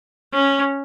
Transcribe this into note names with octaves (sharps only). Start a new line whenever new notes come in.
C#4